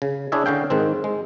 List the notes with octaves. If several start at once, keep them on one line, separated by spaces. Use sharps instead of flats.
C#3
D4 E4 G#4 C#5 E5
D3 C#4 F5 G5
G#2 D#3 C4
G#3